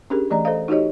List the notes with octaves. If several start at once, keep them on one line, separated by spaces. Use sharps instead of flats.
C#4 D4 G4 G#4 A#4
E3 A3 D5 D#5 A#5
A4 C5 D#5 F5
D#4 F#4 G4 C#5 D#5